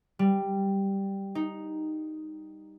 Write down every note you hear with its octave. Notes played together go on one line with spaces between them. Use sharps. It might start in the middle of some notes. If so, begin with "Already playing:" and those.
G3
D#4